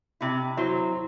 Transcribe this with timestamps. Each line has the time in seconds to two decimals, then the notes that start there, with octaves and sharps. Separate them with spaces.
0.21 C3 E4
0.57 F#3 E4 C5 C6